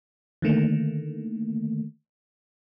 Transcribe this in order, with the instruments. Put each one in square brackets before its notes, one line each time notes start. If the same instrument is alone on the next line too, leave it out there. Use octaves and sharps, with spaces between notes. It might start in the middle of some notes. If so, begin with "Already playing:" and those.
[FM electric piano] D3 D#3 A3 A#3